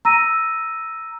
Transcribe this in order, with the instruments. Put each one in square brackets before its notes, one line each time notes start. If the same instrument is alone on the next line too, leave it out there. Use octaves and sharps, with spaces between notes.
[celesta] A#5 E6 A#6 D#7